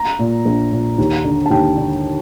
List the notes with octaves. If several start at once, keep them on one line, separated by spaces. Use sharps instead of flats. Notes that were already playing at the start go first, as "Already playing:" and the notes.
Already playing: A#5
A#2
A#1
A#2
D#2
D3
A5
D#2 G5
D3